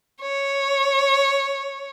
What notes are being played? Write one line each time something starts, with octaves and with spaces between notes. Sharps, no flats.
C#5